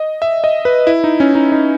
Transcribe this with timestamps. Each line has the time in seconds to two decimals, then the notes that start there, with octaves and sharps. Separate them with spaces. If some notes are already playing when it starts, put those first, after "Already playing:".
Already playing: D#5
0.22 E5
0.44 D#5
0.65 B4
0.87 E4
1.04 D#4
1.20 C#4
1.35 D#4
1.52 D#4